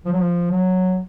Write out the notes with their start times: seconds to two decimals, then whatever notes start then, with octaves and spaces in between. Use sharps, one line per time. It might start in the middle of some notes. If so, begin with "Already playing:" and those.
0.06 F3
0.13 F#3
0.21 F3
0.51 F#3